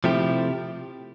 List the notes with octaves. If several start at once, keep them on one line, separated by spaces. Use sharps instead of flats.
C3 F3 A3 E4 G4